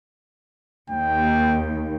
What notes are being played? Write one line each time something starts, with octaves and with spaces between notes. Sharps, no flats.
D#2 G5